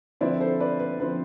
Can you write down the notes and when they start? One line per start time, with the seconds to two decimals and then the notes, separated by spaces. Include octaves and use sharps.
0.21 D3 F3 C4 E4 B4 D5
0.40 A4 C5
0.60 B4 D5
0.80 B4
1.00 D3 F3 C4 E4 B4